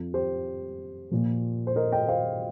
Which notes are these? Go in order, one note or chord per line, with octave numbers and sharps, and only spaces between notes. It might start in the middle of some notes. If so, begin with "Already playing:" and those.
Already playing: F2 F3
G4 C5
A#2 F3
C5
A#4 D#5
D#5 G5
C5 F5